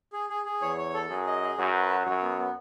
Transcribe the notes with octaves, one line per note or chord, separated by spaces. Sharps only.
G#4
G#4
G#4
E2 C#5
C#5
A4
F#2 G#4
D#5
G#4
F#2 F#4
B4
F#4
F#2 C#5
B3
B3